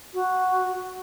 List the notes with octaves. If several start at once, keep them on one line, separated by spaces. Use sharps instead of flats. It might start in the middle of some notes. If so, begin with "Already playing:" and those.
F#4